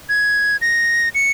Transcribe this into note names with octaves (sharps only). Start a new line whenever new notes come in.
G#6
A#6
C#7